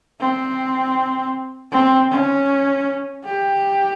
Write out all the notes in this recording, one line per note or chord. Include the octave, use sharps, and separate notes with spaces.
C4
C4
C#4
G4